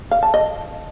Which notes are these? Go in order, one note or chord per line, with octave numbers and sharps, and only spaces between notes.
F5
A5
D#5